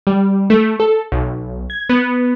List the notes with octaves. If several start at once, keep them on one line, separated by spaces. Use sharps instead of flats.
G3
A3
A4
B1
G#6
B3